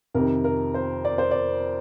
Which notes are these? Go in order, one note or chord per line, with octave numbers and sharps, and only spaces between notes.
F2 C3 D#3 A#4
A#4
C5
D5
C5
D5